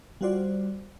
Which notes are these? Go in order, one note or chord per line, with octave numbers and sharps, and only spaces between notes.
G3 F4 F#4 C5 D5